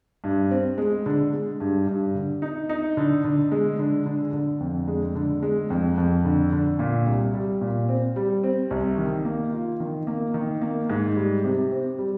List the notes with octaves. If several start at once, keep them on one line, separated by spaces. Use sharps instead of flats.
G2
C4
G#3
D3
G#3
G2
G2
D3
D#4
D#4
D3
D3
G#3
D3
D3
D3
F2
G#3
D3
G#3
F2
F2
D3
D3
A#2
C2
G3
A#2
C4
G3
C4
C2
D#3
A#3
F4
D#3
A#3
D#3
A#3
G#2
G3
C3
C4
G3